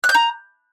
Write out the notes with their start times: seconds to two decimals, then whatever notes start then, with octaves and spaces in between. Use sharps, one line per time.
0.04 F#6
0.09 G6
0.14 A#5